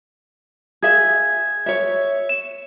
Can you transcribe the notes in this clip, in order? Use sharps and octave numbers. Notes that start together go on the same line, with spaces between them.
G#4 E5 G#6
C#5 E5
E7